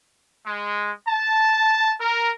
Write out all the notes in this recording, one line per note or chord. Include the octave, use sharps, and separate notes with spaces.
G#3
A5
A#4